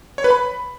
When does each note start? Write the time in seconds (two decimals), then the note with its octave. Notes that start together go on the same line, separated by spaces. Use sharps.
0.18 C#5
0.24 B4
0.30 B5